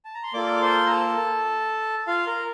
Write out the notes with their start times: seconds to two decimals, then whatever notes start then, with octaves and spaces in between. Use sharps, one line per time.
0.05 A5
0.14 A#5
0.23 C6
0.33 A#3 F4 A4 D5 D6
0.62 C5 C6
0.86 A#5
0.91 A4 A5
2.07 F4 F5
2.26 A#4